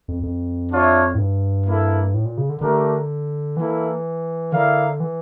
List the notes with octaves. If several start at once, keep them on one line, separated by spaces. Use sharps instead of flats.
F2
F2
D4 F4 C#5 E5
A2
G2
A#3 E4 A4
A2
A#2
C#3
D3
D3 A3 D4 G4 A#4
E3 A#3 E4 A4
D3 E4 A#4 D5 F5
E3